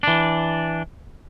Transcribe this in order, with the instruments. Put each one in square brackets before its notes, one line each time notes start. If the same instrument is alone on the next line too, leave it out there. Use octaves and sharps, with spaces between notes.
[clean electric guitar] E3 D4